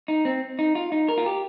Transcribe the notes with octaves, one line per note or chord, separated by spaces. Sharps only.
D#4
C4
D#4
F4
D#4
A#4
F4
G4